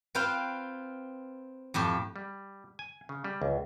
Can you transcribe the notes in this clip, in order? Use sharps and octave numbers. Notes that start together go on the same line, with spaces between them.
C4 F4 B4 C5 F5 G5
F2 A2 G4
G3
G#5
C#3
G3
C#2